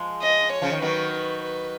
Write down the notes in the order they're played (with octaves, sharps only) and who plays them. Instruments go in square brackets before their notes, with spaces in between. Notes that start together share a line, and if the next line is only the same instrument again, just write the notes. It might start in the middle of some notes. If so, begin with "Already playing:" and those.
Already playing: [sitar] F3 G#3
[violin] D#5
C#5
[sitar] C#3 F3
D#3
[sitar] D#3 F#3 [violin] B4
[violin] B4
B4